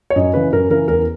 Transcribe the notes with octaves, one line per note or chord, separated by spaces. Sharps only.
C#5
F#2 D#5
C#3 E3 B4
F#2 A#4
C#3 E3 A#4
E2 A#4